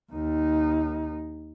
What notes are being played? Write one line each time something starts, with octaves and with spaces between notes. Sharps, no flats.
D#2 D#4